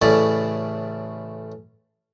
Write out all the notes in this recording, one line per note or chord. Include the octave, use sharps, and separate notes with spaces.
A1 A2 C#3 E4 C#5 D5